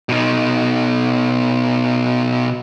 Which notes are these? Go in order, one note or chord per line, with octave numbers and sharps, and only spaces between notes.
B2 D#4